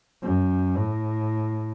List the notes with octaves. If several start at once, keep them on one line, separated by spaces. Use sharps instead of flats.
F#2
A2